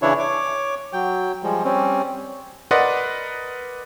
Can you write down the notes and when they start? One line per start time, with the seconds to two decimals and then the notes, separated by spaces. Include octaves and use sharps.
0.02 C#3 E3 D4 E4 C#5
0.19 C#5 D6
0.93 F#3 G5
1.43 F3 G3 G#3
1.64 G3 C4 C#4
2.71 A#4 B4 D5 D#5 F#5 C6